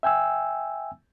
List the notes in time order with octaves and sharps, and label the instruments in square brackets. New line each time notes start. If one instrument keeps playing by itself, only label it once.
[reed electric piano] E5 G5 G#5 E6